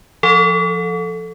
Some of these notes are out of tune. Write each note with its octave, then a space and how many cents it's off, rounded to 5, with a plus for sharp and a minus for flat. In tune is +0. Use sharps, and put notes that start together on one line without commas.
F3 +0 A4 +0 F#5 -45